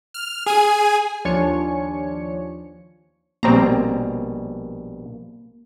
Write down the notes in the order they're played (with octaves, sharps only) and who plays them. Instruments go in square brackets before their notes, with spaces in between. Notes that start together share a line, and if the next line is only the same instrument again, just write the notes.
[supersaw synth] F6
G#4 G#5
[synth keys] D#2 F3 D4 C#5 G#5 C#7
[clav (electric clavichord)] A#1 B2 G3 [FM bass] A#3 [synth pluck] C4 A#5